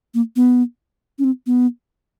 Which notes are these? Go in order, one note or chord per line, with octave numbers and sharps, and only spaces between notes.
A#3
B3
C#4
C4
B3